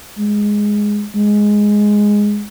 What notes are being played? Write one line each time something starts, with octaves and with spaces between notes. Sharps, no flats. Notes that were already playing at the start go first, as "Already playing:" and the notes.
G#3
G#3